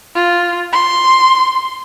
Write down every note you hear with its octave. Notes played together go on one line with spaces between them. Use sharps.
F4
C6